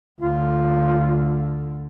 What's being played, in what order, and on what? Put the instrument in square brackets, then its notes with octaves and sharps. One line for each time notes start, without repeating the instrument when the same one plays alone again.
[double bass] D2 D3 [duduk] F4